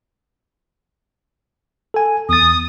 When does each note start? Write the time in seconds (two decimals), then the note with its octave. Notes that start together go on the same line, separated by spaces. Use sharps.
1.94 A4 G#5
2.29 E2 D#6 A6